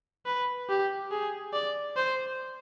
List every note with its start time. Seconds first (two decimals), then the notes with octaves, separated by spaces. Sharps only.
0.26 B4
0.69 G4
1.11 G#4
1.53 D5
1.96 C5